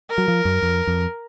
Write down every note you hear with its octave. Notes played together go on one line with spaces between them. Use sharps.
A#4
F#3
F3
F#2
F2
F2